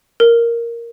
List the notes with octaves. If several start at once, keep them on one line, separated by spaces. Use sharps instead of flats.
A#4